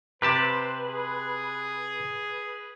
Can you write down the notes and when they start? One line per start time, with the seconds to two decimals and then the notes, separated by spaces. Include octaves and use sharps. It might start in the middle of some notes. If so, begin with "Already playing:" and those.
0.22 C3 G4 B4 C5 A5
0.85 G#4